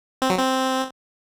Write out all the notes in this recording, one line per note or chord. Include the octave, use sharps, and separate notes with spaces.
C4
F#3
C4